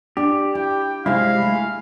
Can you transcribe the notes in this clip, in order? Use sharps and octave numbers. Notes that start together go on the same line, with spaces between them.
D4 G4
E4 G5
C3 G3 G#3 E4 E5 F5
A3